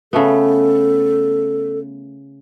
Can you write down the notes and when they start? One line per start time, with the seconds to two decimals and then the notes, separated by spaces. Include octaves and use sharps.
0.13 C#3 A3 B3 A4